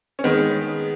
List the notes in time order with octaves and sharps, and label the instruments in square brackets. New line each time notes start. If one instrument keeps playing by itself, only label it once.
[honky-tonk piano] C#4
[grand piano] D#3 [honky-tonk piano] G#3 B3